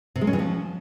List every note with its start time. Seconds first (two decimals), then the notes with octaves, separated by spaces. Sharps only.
0.16 C3
0.21 G#3
0.27 C#4
0.33 E3
0.39 F3